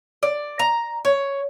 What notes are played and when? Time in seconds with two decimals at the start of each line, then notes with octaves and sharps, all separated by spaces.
0.23 D5
0.59 A#5
1.05 C#5